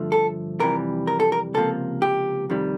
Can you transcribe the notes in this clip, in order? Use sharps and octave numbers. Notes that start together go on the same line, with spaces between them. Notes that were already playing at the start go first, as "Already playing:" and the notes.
Already playing: G2 D3 F3 A3
A4
F2 C3 E3 G3 A#4
A#4
A4
A#4
C#2 C3 F3 A#3 A4
G4
F2 C3 D#3 G3